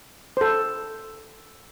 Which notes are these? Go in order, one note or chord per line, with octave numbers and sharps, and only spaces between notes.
A4 C5